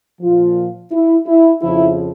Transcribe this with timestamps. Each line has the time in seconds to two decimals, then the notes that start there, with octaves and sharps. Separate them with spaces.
0.21 A#2 F3 F4
0.92 E4
1.26 E4
1.62 F2 C#3 F3 E4